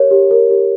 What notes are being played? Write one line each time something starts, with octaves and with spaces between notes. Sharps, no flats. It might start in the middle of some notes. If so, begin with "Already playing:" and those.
Already playing: G4 A#4 C#5
G4
A#4
G4